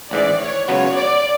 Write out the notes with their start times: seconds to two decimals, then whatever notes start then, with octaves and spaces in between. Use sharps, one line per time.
0.11 A1 G#2 E3 D5
0.40 C#5
0.67 C#2 C#3 F#3 B3 F#4 C#5
0.96 D5